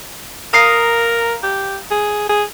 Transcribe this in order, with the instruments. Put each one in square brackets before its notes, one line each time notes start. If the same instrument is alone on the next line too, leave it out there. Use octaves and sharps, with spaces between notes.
[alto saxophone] A#4 [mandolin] F5 A#5 D#6
[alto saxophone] G4
G#4
G#4